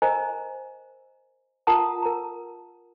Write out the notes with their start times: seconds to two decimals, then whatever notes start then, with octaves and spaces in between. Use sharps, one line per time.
0.02 A#4 C5 D#5 G#5 A#5
1.67 F4 A#4 F#5 A5 A#5 D#6
2.02 A#4 A#5